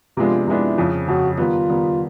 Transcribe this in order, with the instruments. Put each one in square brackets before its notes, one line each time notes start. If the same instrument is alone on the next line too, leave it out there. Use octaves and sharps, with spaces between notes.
[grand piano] C3 F3 G#3 B3 D4 [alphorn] F4
[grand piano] C3 F3 G#3 B3 D4 [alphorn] E4
[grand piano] F2 C#3 F3
[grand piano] F2 C#3 F3 [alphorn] F#4
[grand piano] D#3 G3 B3 [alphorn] F4
[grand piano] D#3 G3 B3